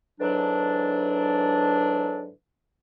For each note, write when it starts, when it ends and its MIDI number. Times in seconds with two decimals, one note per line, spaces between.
0.20 2.30 44
0.20 2.30 50
0.20 2.30 52
0.20 2.30 54
0.20 2.30 62